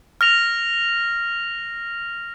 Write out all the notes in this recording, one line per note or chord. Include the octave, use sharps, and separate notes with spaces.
F6 A#6 F7